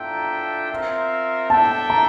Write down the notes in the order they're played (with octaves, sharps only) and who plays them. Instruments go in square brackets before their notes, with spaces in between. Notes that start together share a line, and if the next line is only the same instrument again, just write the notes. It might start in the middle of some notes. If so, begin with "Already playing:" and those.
Already playing: [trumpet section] D4 F4 A4 E5 G5 [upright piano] A#5
[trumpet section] C4 F4 A#4 E5
[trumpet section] D4 A4 E5 G5 [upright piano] A5
[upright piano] A#5